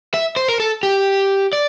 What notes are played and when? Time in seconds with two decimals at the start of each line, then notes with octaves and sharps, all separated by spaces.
0.14 E5
0.36 C5
0.48 A#4
0.60 A4
0.83 G4
1.53 D5